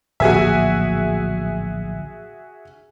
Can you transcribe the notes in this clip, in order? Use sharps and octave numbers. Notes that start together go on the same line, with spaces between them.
D1 A#1 F#4 G#4 E5